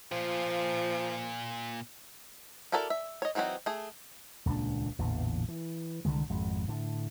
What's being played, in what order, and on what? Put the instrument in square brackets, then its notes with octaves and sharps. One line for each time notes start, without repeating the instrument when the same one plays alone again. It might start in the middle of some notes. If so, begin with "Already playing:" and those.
[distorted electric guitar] A#2 F4 [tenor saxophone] F3
[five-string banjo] E4 F#4 A4 A#4 D5
E5
C#5 D#5
E3 F#3 C4 D#4 F#4
A3 G#4
[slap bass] D#1 C#2 A#2 D4
A1 E2 A#2 D3
E3
C2 D3 D#3 G#3
G#1 F2 G#3
A2 D3